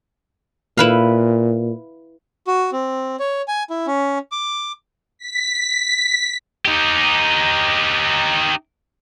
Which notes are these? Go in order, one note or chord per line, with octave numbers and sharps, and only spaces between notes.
A#2 E4 B4 F5
F#4
C4
C#5
G#5
E4
C#4
D6
B6
D#4 G4